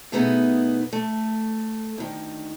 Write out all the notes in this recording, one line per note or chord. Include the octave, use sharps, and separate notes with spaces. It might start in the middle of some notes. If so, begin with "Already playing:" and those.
B2 A3 B3 D#4 G#4
A3
D2 D#3